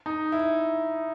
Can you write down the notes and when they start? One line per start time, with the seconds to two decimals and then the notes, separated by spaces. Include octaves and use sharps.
0.06 D#4
0.32 E4